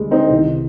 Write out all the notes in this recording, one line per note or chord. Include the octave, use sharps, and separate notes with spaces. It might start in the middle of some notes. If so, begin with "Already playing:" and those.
Already playing: D2 D3 G3 G#3
C4 D#4
C2 C3 D#3